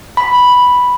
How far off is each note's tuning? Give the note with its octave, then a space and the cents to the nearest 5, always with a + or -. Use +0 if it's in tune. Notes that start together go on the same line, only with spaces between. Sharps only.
B5 -5